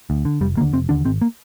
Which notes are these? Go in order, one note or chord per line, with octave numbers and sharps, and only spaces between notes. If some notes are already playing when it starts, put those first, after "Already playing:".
D2
D3
F1 G3
D#2 D3 A#3
F1 C4
D#2 D3 D4
G#1 C4
A#3